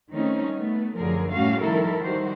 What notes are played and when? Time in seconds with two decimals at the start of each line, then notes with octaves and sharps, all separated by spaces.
0.11 D#3 G3 A3 C4 C#4 D#4
0.54 A3 B3
0.97 F#2 D3 F3 G#4 A#4
1.32 A2 G3 A3 C#4 F#4 F5
1.62 D#3 F3 G3 E4 A4 A#4
2.00 D#3 G3 F#4 C5